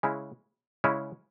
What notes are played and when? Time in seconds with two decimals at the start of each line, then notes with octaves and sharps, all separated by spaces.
0.03 C#3 G#3 C#4 E4
0.84 C#3 G#3 C#4 E4